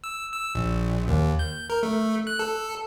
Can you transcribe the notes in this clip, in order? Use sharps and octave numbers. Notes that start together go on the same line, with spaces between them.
E6
E6
A#1
D#2
G6
A#4
A3
F#6
A4